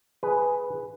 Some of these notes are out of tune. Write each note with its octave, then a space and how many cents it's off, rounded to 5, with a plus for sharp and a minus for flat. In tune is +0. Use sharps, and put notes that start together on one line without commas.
G#4 +0 B4 +0